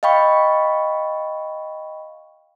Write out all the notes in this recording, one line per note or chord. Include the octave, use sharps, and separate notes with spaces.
D#5 F5 G5 B5 C#6